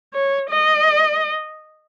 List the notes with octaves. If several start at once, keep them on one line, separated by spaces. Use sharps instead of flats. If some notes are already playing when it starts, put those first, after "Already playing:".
C#5
D#5